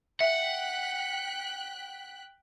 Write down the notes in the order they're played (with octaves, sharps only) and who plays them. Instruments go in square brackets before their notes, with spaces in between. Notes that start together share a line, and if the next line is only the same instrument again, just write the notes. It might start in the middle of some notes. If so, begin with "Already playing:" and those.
[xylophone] E5 [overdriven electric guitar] F#5 [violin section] G5 F#6 B6